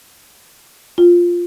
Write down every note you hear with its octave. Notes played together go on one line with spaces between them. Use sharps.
F4